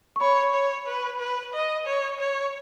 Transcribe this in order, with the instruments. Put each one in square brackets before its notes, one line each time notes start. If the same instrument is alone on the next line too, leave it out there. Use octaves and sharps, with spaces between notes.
[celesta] C#6
[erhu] C#5 [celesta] B5
[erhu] C#5
B4
B4
D#5
C#5
C#5